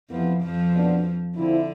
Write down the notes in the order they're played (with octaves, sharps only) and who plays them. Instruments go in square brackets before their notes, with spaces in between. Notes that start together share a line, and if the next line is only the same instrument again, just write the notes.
[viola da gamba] F2 F3 [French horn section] C3 E3 B3
[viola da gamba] F2 F3
[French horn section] B2 B3 D4
[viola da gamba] D3 [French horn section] F3 C4 E4